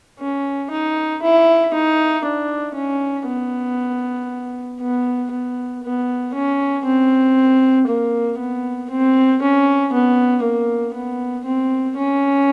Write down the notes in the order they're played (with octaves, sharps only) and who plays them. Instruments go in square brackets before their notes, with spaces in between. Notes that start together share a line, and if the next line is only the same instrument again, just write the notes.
[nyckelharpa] C#4
D#4
E4
D#4
D4
C#4
B3
B3
B3
B3
C#4
C4
A#3
B3
C4
C#4
B3
A#3
B3
C4
C#4